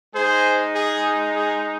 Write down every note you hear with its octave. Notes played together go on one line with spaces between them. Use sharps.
G#3 D#4 G#4 C5
G#4
G#4